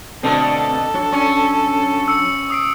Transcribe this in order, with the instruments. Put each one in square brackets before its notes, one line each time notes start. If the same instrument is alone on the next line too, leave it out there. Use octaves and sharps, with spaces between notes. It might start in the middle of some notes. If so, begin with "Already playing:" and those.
[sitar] B2 D3 [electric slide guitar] A3 C4 [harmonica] A4
[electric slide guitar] F#3 D4 C#5
[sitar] C#4 [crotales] C#6 C#7
[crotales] E6 C#7
D#6 C7 D7